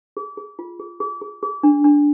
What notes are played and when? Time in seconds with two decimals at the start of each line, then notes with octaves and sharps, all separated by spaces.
0.17 G#4
0.37 G#4
0.59 F4
0.80 G#4
1.00 G#4
1.21 G#4
1.43 G#4
1.63 D4
1.84 D4